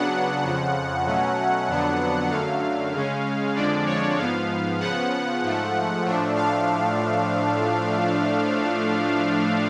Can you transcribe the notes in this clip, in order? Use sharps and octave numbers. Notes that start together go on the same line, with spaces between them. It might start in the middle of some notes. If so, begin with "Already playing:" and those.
Already playing: C#3 F#3 B3 D4 F#5
F2 C#3 F3
B2 F#3 A3 C#4
F2 D3 F#3 B3 D4
F#2 D3 F#3 A3 F5
C#3 G#3 C#4
F2 D3 F3 G#3 D4 D5
C#5
G#2 F3 B3 F5
C#3 F3 B3 F#5
G#2 F3 A3
A2 F3 A3 D4
F5